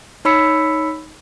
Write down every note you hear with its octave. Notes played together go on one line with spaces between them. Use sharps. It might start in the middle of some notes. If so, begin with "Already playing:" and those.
D#4 C#5 B5 E6 B6 C#7